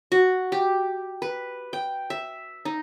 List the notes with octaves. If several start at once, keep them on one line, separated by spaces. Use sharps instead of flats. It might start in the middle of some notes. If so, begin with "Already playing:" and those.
F#4
G4
B4
G5
E5
D#4